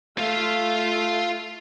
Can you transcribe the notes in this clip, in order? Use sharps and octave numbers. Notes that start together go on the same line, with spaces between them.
A3 F4 F5